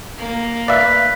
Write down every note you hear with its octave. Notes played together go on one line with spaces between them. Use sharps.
A#3
B4 D5 E5 F5